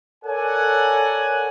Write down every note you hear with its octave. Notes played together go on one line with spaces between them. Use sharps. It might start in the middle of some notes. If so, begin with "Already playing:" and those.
A4 A#4 C#5 D5 F#5 G#5